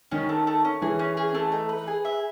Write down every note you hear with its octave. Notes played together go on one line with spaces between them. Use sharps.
D#3 C#4
A3
A3
C#4
E3 G#4
C#4
G#4
A3
D#4
B4
G#4
E5